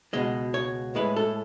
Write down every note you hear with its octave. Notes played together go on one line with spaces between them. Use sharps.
C#2 B2 G#3 D#5
C#5
A2 G#3 B4
A4